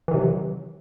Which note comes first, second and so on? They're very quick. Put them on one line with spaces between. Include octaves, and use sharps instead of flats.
E3 D#3 C3 F#3